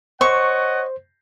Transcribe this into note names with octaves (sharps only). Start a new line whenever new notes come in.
C5 C#5 D#5 F#5 C#6